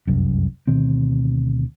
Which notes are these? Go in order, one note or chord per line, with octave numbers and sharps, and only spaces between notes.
F1 C2 F#2
D2 B2 D#3 C4